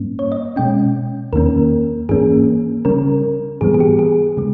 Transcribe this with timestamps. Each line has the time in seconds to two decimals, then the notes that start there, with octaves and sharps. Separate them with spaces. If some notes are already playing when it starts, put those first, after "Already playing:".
Already playing: G#2 G3 A#3 C#4
0.19 C#5
0.32 D#5
0.56 B2 G#3 C#4 G5
1.33 E2 D#3 A#3 C#4 A#4
2.09 G#2 E3 A#3 C#4 G#4
2.85 C#3 G3 C#4 A#4
3.61 G#2 E3 G3 B3 G#4
3.74 G#4
3.80 G4
3.99 G#4
4.37 C#3 G#3